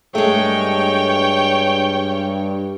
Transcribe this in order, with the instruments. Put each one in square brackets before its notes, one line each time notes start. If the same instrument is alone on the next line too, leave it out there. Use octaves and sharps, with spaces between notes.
[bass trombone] G2 [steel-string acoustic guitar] G#3 A3 [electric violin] C#5 G5